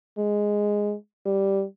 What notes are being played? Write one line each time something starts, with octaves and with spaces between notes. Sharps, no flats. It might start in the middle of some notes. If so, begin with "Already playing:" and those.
G#3
G3